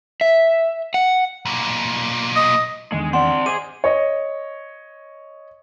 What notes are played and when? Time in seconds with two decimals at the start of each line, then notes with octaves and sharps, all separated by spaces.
0.21 E5
0.94 F#5
1.45 B1 A#2
2.36 D#5
2.92 E2 D3 D#3 G#3
3.13 C4 D5 F#5 C6
3.46 G#4 C5 D#5 D6 D#7
3.84 C#5 D#5